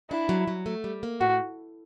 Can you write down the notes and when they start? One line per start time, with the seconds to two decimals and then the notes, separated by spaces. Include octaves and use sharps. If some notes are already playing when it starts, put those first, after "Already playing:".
0.10 D4 E4
0.29 F#3
0.48 F#3
0.66 A3
0.84 G3
1.03 A#3
1.20 A2 F#4